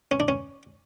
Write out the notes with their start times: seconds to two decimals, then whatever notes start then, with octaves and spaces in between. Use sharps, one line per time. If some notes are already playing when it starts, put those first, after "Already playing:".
0.11 C#4
0.20 D4
0.28 C#4